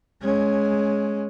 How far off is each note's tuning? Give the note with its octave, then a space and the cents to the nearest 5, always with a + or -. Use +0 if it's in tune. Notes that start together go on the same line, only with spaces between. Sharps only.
G#3 +15 C#4 +0